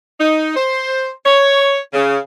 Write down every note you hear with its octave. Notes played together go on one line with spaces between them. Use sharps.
D#4
C5
C#5
C#3